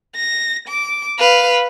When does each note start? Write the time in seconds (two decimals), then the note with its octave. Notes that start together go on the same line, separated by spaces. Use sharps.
0.15 A#6
0.68 D6
1.18 B4 F5